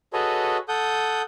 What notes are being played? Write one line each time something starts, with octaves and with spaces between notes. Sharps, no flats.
F#4 G#4 A4 B4 C#5 D#5
A4 F#5 D#6 G6